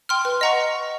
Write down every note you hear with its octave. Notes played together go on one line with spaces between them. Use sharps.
G5 C6 F6
B4
D#5 F#5 A#5 C#6